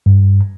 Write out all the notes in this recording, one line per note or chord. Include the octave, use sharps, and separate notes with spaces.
G2